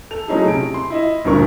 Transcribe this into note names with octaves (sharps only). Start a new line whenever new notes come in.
A4 F7
F#3 A3 C#4 D#4 E4 G#4
C3 D7
C6
E4 D#5 E5
D2 G2 A#2 A#4 C#6